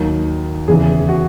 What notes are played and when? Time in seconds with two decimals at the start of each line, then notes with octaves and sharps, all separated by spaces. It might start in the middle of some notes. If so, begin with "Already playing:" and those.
Already playing: D#2 D#3 F#3
0.68 E2 C#3 E3 G#4
1.09 F#4